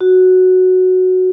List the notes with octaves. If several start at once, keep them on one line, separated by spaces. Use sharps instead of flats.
F#4